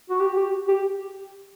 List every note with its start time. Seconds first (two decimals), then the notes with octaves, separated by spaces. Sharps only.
0.10 F#4
0.21 G4
0.36 G4
0.68 G4